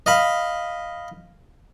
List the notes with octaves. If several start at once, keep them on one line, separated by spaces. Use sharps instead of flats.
D#5 F5 B5